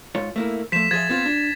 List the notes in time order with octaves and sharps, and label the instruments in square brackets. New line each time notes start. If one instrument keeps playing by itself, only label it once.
[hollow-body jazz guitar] G#2 F4 C#5
A3 A#3 E4
[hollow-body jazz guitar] F3 A3 [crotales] B6 E7
[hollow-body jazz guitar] F3 G#4 E5 [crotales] G#6 A6
[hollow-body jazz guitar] B3 C4 F4
D4